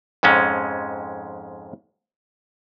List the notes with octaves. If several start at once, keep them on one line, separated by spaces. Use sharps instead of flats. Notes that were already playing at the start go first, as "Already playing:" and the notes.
F2 G#2 G#3 C#4